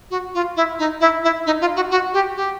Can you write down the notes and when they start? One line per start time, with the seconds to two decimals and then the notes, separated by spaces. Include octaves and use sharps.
0.10 F#4
0.34 F4
0.56 E4
0.79 D#4
1.00 E4
1.23 E4
1.46 D#4
1.61 F4
1.76 F#4
1.90 F#4
2.13 G4
2.36 G4